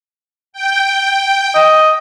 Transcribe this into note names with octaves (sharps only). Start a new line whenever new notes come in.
G5
D#5